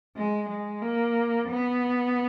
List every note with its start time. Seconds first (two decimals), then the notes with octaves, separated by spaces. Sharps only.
0.17 G#3
0.49 G#3
0.82 A#3
1.48 B3